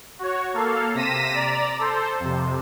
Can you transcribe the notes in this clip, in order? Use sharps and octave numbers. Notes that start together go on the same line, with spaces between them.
F#4 C#5
A#3 A4 F5
C3 A#6 B6 D#7 E7
D5 A#5
A4 C5
F2 C3